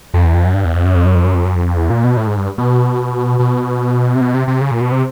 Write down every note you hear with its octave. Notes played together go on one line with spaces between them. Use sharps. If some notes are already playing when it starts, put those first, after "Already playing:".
F2
E2
F2
F#2
G2
E2
F2
F#2
F2
F#2
F2
F#2
F2
F#2
F2
E2
A#2
B2
A2
G#2
G2
B2
B2
C3
B2
C3
C3
C#3
A#2
B2
C3